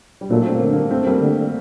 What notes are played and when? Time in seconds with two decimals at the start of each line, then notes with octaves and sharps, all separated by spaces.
0.21 G3
0.30 A#2 F#3 A3
0.46 C4
0.55 A#3
0.61 D3 A3
0.73 G3 A#3
0.91 A3 C4
1.07 G3 A#3
1.21 D3